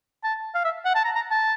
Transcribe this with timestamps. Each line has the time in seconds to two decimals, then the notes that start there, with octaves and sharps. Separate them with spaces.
0.24 A5
0.55 F5
0.64 E5
0.85 F#5
0.95 A5
1.05 A#5
1.15 A#5
1.31 A5